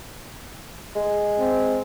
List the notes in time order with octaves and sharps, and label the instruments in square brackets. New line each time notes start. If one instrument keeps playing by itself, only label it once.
[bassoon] G#3
[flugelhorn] C4